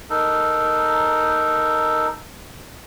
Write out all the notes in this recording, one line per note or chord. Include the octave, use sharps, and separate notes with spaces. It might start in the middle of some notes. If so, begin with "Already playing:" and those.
D#4 A4 A#4